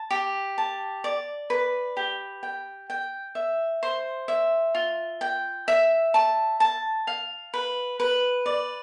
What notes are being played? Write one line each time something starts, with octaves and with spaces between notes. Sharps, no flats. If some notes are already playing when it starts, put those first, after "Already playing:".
Already playing: A5
G4
A5
D5
B4
G4
G5
G5
E5
C5
E5
F4
G5
E5
A5
A5
F5
B4
B4
D5